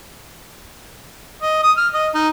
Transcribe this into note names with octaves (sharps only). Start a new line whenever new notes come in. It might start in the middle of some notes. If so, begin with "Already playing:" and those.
D#5
D#6
F6
D#5
D#4